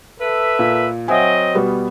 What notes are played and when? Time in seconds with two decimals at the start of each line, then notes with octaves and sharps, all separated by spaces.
0.20 A4 B4 E5
0.59 A#2
1.08 F#3 C4 D#5 E5 F#5 G#5
1.55 B2 G3 B3